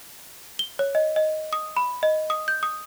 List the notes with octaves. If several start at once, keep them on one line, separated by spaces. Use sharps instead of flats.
G7
C#5
D#5
D#5
D#6
B5
D#5
D#6
G6
D#6